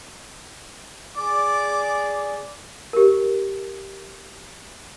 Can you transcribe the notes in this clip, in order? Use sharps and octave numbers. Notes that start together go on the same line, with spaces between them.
G#4 D5 D6
G4 A#4